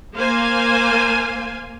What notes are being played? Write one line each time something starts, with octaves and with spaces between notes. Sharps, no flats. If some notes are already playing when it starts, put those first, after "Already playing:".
A#3 C5 F5 G#5